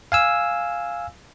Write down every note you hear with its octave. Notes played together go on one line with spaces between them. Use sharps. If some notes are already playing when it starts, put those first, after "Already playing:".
F5 G#5 E6